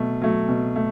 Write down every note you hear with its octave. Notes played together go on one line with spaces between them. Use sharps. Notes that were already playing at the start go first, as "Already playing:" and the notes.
Already playing: B2 F#3 A3
F#3 A3
B2
A3